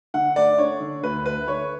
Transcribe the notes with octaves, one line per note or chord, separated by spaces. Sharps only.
D3 F#5
A3 D5
D4 C#5
D3
D2 B4
A3 B4
D3 C#5